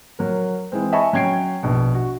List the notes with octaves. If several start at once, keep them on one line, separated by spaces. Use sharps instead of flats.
F#3 A#4
E3 G#3 C4
D#5 E5 G#5 A5 B5 C#6
F#3 C#4 G5 G#6 C7 D7
A#1 B2
F#4